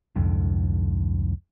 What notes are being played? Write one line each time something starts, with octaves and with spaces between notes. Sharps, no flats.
C2 F2 G#2 D3